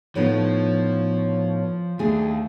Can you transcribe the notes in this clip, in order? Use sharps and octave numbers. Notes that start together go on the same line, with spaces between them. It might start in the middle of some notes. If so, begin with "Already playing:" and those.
A2 F3 B3 D#4 C#5
D#2 A3 D4 G#4